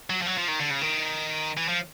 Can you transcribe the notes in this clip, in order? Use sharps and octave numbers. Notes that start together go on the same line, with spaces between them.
F#3
F3
F#3
F3
D#3
D3
C#3
D#3
E3
F3